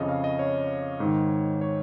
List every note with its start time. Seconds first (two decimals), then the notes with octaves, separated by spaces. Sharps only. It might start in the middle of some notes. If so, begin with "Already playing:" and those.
Already playing: F2 C#3 C#5 D#5
0.09 F5
0.24 D#5
0.39 C#5
1.00 G#2 D#3
1.61 C#5